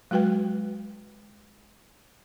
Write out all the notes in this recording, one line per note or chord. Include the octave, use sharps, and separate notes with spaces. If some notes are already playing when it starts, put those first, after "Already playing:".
F#3 G#3 F#4 B4 G5